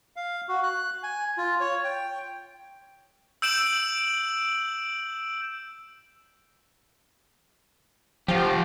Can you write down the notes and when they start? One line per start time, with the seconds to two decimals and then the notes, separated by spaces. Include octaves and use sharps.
0.16 F5
0.49 F#4
0.63 F#6
1.03 G#5
1.38 F4
1.60 C#5
1.84 G5
3.42 E6 G6 D7 E7 F#7
8.28 F3 F4 G4